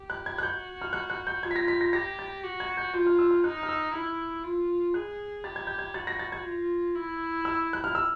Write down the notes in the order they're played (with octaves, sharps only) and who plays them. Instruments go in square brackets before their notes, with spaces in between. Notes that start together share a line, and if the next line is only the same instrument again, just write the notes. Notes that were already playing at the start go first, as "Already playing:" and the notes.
Already playing: [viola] G4
[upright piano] F#6
G#6
F#6
[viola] F#4 [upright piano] G6
[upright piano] F6
F#6
F#6
G6
[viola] F4 [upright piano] G#6
[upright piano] B6
A#6
B6
A#6
[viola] G4 [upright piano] A#6
[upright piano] A6
[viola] F#4
[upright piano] G#6
G6
[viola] F4 [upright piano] G6
[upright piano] F6
E6
F6
[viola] D#4 [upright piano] F#6
[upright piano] F6
E6
[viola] E4 [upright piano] F6
[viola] F4
[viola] G#4 [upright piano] F#6
[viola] G4 [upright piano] A6
[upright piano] G#6
G6
G#6
[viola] F#4 [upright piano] A6
[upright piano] A#6
A6
G#6
[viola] F4
E4
[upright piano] E6
F#6
F6
E6